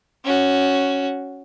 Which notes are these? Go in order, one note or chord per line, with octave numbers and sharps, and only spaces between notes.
C#4 F#4